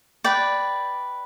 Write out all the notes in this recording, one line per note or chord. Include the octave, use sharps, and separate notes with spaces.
B4 D5 G5